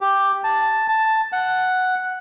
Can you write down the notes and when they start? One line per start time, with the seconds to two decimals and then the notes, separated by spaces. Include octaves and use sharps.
0.01 G4
0.44 A5
0.88 A5
1.32 F#5